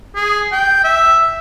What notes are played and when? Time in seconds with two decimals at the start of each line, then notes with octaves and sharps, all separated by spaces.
0.16 G#4
0.52 G5
0.84 E5